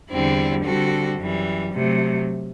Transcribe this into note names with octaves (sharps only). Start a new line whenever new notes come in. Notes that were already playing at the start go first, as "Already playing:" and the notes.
E2 D3 G3 C4 E4
D3 G3 C4 F#4 A4
F#2 E3 G3
C3 F#3 A3